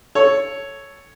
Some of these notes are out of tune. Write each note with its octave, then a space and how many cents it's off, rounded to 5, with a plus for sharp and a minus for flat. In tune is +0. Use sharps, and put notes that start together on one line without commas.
A4 +0 C#5 +0